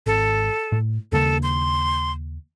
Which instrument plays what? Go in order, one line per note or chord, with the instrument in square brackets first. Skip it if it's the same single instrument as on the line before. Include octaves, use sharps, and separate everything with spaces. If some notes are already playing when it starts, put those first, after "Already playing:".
[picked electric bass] G#1 [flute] A4
[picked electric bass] A2
[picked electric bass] D#2 C#3 A#3 [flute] A4
[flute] C6